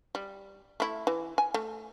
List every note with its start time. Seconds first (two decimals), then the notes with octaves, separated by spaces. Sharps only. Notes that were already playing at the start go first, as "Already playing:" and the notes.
0.15 G3
0.80 A3 E4
1.07 E3
1.38 G#5
1.54 A3